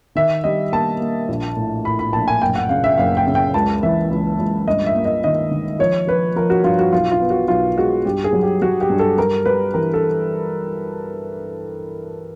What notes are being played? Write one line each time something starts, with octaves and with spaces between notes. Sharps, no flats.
D#3 E5
G3 D#5
A#3 A5
A#3
A#1
A2
A2 B5
B5
A#1 A5
G#5
F#1 G5
F#5
C#3 F5
E5
F#1 F5
G5
C#3
G5
C#2 A5
E3 E5
C#2
C#2
G2 D#5
E5
A#3
D#5
D#3 D#5
D#3
F3 C#5
F3 B4
F3 A#4
F#4
G2 F4
F#4
B1 F4
F4
B3
F#4
B1 F4
G#3 F#4
G2 G4
G#4
F#3
G4
F#3 F#4
G4
G2
A4
G3 A#4
G3 B4
E3 A#4
A4